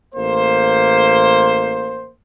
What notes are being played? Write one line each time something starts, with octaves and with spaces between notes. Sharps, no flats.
A1 A#3 C5